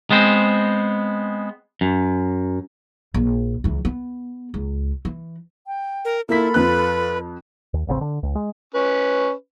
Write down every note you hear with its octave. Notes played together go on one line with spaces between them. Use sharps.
G#3 B3 C4 C5
F#2
A#1
C#2 E3
B3
C#2
E3
G5
A#4
A#3 E4 F4 A4 B5 B6
F2 B4 F#6
D#2
D#1 A1 C#3 C4
D3
C#2
G#3
C#4 B4